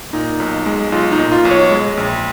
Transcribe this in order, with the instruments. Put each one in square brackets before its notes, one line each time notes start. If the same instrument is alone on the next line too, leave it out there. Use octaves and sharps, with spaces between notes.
[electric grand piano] A#2 D#4
B1
G#3
B1 F4
D#4
A#2
F4
B1
C#5
G#3
A#1